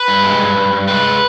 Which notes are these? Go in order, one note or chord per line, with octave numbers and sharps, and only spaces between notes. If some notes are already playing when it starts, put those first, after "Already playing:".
Already playing: B4
G2
G#3
G2
G2
G2
G#3 B4